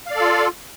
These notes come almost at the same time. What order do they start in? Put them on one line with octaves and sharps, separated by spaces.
F5 D5 A4 F4